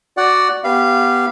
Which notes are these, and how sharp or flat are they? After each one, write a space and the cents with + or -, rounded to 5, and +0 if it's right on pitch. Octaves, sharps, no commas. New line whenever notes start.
F#4 +0 D5 +0 F#5 +10
B3 -5 G4 +0 F5 -20